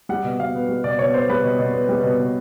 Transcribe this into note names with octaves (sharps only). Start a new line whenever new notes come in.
G3 F#5
B2
B2 F5
B3
G3
B2 D5
B2 C#5
B3 C5
G3 B4
B2
B2
B3
G3
B2
B2